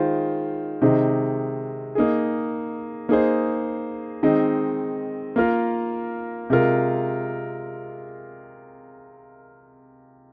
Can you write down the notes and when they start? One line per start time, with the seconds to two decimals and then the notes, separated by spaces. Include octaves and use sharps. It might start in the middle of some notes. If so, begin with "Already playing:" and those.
Already playing: D#3 G#3 F4 C5
0.82 C3 D#3 G#3 D#4 C5
1.95 A#3 D#4 G#4
3.09 A#3 D#4 G#4 C5
4.23 D#3 G#3 C4 D#4
5.36 A#3 F4 A#4
6.50 C3 G#3 F4 A#4